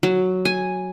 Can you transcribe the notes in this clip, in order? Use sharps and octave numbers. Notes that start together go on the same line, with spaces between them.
F#3
G#5